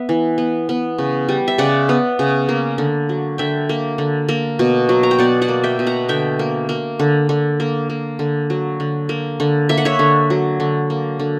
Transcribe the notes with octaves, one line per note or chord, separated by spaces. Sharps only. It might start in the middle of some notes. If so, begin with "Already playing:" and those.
Already playing: B3 E5
E3
B3
B3
C#3
G3
E5
C#3 D5 F#5
B3
C#3
A#3
D3
F#3
D3 E5 G5
A#3
D3
A#3
B2
F#3
A#5
G5
B2 D5 F#5
D5 F#5
A#3
E5 G5
B2
F#5 A#5
D3 E5 G5
A#3
A#3
D3
D3
A#3
A#3
D3
F#3
D3
A#3
D3
A#3 E5
F#5
C#5 E5
D3
F#3
D3
A#3
D3